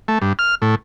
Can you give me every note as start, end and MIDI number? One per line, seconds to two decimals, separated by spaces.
0.08 0.18 57
0.22 0.33 43
0.39 0.55 89
0.62 0.75 45